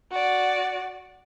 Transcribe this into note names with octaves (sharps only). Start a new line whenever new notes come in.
F#4 D5